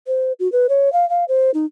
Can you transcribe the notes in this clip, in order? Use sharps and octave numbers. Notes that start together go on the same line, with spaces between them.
C5
F#4
B4
C#5
F5
F5
C5
D#4